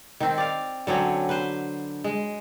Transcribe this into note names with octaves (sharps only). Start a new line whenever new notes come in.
D#3 C4
D5 F5
D3 F#3 C4 C#4
B4 C5
G#3